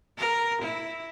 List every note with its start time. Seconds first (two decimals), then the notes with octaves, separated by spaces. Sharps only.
0.18 A#4
0.62 E4